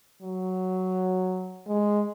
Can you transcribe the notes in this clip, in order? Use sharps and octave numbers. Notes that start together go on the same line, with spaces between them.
F#3
G#3